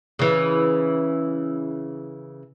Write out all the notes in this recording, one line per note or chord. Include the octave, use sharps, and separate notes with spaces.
C#3 E3